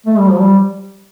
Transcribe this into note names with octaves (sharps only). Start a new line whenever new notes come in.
A3
G3
F3
G3